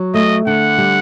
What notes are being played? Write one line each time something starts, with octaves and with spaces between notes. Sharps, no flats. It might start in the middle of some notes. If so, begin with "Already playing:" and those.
Already playing: F#3
A3 D#5
D3 F#5
G3